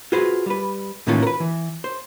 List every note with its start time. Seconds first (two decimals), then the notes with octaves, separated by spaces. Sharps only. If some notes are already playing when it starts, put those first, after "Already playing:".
0.12 F4 F#4 G#4 B4 C5
0.46 G3 B4
1.07 A2 D#3 E3 A#3 C#4 F4
1.23 A#4 B4
1.40 E3
1.84 C5